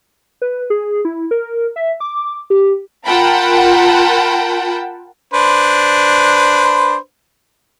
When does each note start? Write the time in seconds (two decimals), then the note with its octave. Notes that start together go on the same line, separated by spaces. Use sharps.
0.42 B4
0.70 G#4
1.05 E4
1.31 A#4
1.76 E5
2.00 D6
2.50 G4
3.06 F4 A#4 F#5 G5 A5 B5
5.34 D4 B4 C5